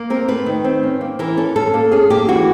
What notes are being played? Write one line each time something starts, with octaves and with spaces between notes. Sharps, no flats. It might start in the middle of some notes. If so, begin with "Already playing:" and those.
Already playing: A#3
C4 A#4
A3 B4
D#3
C4
C#4
A#3
E3 A#4
C#4 A4
C#4 A4
A#3
C#4 G#4
A#3 G4
E3 F#4